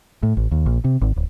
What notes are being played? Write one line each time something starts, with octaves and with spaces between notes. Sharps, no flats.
A2
A1
D#2
A#1
C3
G#1
D1